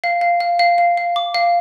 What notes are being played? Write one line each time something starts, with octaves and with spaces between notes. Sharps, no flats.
F5
F5
F5
F5
F5
F5
D6
F5